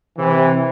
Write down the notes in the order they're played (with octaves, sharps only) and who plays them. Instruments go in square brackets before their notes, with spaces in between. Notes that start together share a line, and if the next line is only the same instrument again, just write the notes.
[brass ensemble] C3 E3